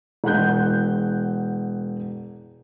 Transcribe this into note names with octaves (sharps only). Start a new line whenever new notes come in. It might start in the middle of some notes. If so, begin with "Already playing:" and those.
E1 F#5 F#6 G6